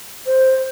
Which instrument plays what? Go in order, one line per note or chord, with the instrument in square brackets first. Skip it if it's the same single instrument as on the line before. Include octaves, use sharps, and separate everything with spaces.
[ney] C5